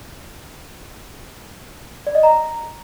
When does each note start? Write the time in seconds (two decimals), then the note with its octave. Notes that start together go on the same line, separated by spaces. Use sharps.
2.07 D5
2.15 D#5
2.23 A#5